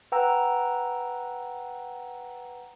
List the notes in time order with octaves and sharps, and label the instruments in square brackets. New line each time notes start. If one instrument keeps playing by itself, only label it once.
[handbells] B4 F#5 G5 A#5 E6